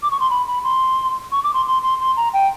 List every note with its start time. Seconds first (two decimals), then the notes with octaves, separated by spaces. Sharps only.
0.03 D6
0.11 C#6
0.20 C6
0.30 B5
0.47 B5
0.64 C6
1.32 C#6
1.44 D6
1.54 C6
1.66 C6
1.83 C6
1.99 C6
2.17 A#5
2.33 G5